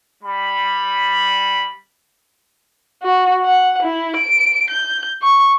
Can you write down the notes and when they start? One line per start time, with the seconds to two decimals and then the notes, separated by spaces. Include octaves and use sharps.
0.23 G3 B5
3.03 F#4
3.44 F#5
3.83 E4
4.16 D7
4.70 G6
5.22 C#6